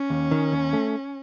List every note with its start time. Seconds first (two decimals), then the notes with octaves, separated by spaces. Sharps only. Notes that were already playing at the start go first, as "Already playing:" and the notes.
Already playing: C#4
0.10 D#2
0.31 D#3
0.52 D#2
0.73 A3